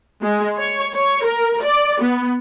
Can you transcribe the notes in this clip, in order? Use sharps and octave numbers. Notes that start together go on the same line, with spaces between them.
G#3
C#5
C#5
A#4
D5
B3